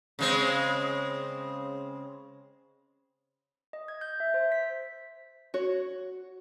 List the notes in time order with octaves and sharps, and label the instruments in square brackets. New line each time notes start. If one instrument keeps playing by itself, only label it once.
[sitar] C#3 G#3 C4
[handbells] D#5
G#6
G6
E5
C5
B6
[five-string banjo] F#4 C#5